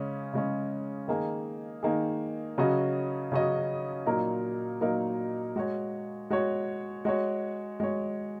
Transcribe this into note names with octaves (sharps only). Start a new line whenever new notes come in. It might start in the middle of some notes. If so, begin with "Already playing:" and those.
Already playing: C#3 G#3 C#4
C#3 G#3 C#4
D#3 A#3 D#4 G#4
D#3 A#3 D#4 G#4
C#3 F#3 C#4 F#4 D#5
C#3 F#3 C#4 F#4 D#5
A#2 F#3 A#3 D#4 A#4
A#2 F#3 A#3 D#4 A#4
G#3 F#4 C#5
G#3 F#4 C#5
G#3 F#4 C#5
G#3 F#4 C#5